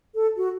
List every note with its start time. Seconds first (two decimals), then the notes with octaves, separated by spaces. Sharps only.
0.15 A4
0.37 F#4